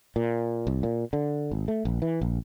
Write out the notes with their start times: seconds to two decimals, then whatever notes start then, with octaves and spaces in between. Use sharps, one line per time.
0.16 A#2
0.67 C2
0.83 A#2
1.13 D3
1.51 G#1
1.68 A3
1.85 A#1
2.02 E3
2.21 A#1